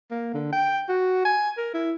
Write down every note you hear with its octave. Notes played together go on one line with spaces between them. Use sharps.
A#3
D3
G5
F#4
G#5
A#4
E4